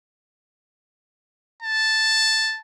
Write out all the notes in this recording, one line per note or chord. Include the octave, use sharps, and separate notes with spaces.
A5